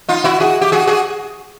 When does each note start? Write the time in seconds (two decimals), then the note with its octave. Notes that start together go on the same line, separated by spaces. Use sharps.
0.09 D#4 F4
0.24 E4 F#4
0.40 F#4 G#4
0.61 G4
0.72 F#4 G#4
0.87 F#4 G#4